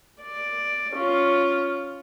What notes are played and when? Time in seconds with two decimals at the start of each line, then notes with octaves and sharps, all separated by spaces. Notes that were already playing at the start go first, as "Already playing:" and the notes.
0.22 D5
0.93 C#4 F4